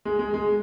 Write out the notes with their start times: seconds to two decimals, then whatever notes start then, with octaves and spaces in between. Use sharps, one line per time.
0.05 G#3
0.19 G#3
0.34 G#3